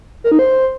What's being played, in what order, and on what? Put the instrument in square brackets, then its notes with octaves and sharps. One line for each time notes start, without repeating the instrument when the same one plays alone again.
[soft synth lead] A#4
D#4
C5